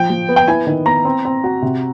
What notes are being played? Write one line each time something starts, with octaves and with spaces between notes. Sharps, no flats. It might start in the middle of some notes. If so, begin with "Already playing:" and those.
Already playing: F3 G5
F3
B3
G5
E4 G#5
D#3
B3 A#5
C4
C4
F#4
C3